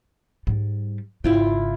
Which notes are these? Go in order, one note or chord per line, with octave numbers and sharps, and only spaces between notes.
G#2 G3
G#1 C#3 E4 F4 G5